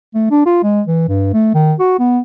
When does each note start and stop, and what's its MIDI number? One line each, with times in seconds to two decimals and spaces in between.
0.15 0.28 57
0.31 0.45 62
0.46 0.60 65
0.63 0.82 56
0.87 1.07 52
1.08 1.32 43
1.33 1.53 57
1.55 1.74 51
1.80 1.96 66
1.99 2.19 59